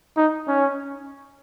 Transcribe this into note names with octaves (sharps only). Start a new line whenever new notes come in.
D#4
C#4